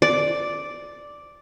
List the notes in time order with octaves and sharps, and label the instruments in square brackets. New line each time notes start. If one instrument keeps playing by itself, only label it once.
[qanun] D5